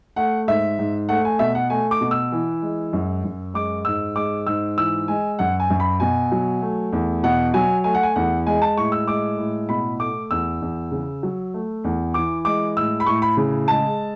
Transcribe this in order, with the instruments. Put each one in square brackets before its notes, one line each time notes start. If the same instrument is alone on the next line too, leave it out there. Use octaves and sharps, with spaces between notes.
[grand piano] A3 F#5
G#2 E5
G#2
A3 F#5
G#5
B2 E5
F#5
A3 G#5
D6
B2
E6
E3
G#3
F#2
F#2
G#3 D6
G#2 E6
G#3 D6
G#2 E6
E3 E6
G#3 G#5
F#2 F#5
G#5
F#2
B5
B2 G#5
F#3
A3
E2
B2 F#5
F#3 G#5
A3 G#5
F#5
G#5
E2 F#5
G#3 G#5
A5
A2 C#6
E6
G#3 D6
A2
B2 B5
A3 D6
E2 E6
E2
C#3
F#3
A3
E2
E3 D6
G#3 D6
A2 E6
B5
A2 C#6
B5
C#3
G#3 A5